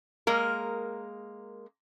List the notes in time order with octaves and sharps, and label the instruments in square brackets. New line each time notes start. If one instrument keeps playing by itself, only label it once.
[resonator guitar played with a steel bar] G#3 A#3 A#4